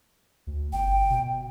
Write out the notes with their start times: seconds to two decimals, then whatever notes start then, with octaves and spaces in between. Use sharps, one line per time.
0.47 D2
0.73 G1 G5
1.10 B2